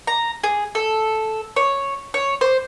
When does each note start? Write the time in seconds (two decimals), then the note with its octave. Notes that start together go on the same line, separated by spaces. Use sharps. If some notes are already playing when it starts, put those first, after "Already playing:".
0.07 A#5
0.44 G#4
0.75 A4
1.56 C#5
2.14 C#5
2.41 C5